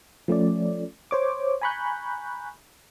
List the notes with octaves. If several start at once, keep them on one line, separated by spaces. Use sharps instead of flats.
F3 A3 C#4 D5
C5 C#5 D6
G#5 A#5 B5 C#6 F#6 G6